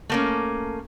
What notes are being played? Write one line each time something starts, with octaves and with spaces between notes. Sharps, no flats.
A3 A#3 C#4